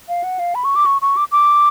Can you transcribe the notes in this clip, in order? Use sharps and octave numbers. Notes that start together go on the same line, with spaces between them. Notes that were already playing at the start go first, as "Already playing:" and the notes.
F5
F#5
F5
B5
C#6
D6
C#6
C#6
D6
D6